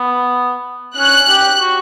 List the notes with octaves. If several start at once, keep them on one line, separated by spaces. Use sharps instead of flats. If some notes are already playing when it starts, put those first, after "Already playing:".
Already playing: B3
C#4 F#6
G4
F#4